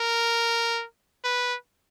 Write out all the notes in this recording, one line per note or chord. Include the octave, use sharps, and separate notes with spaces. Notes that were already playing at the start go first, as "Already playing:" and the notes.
Already playing: A#4
B4